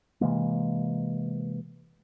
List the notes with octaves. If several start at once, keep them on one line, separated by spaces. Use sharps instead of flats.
C3 E3 G#3 A#3